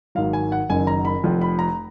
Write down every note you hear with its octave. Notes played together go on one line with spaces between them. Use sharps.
G#1 G#2 F#3 F5
G#5
F#5
F#1 F#2 D#3 G#5
A#5
B5
F1 F2 F3
B5
A#5